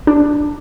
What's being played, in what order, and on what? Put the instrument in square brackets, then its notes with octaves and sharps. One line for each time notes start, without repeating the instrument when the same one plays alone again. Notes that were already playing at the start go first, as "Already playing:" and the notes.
[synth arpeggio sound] D4